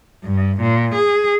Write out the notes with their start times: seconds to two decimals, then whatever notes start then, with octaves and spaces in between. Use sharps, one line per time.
0.24 G2
0.61 A#2
0.95 G#4